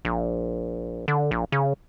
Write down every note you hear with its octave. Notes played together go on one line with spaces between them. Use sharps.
A#1
D3
A#1
C#3